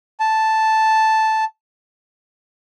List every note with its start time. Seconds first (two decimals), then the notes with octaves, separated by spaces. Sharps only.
0.20 A5